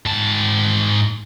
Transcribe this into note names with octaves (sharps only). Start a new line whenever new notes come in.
G#2 A5